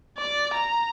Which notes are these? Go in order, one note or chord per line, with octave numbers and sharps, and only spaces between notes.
D5
A#5